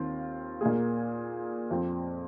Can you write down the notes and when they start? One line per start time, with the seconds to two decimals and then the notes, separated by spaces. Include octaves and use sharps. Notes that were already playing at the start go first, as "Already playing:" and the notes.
Already playing: D#2 D#3 C4 F4
0.61 A#2 A#3 G#4
1.71 F2 F3 C4